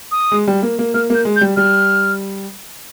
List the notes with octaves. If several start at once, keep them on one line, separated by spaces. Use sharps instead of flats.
D#6
G#3
G3
A#3
A#3
A#3 F6
A#3 G6
G#3
G6
G3
G3 F6